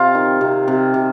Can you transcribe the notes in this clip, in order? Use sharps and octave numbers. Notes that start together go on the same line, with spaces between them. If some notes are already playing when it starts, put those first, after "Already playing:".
Already playing: C3 F4
D#3
C3
C3
C3